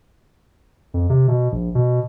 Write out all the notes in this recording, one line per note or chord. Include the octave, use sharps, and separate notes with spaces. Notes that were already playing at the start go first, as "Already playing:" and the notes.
F2
C3
B2
A#1
B2